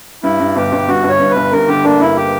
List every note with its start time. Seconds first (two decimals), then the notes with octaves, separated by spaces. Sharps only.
0.23 G2 E4
0.40 G2
0.56 G1 G4
0.72 G1
0.88 G2 F#4
1.03 G1
1.09 C#5
1.20 G2
1.31 B4
1.36 G1
1.52 G2 A#4
1.68 D3 G4
1.84 A#3 D4
2.00 G2 E4
2.16 G4